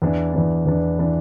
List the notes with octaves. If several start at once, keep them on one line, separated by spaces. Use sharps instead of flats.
E2 E3 D4
E2 E3 D4
E2 E3 D4
E3 D4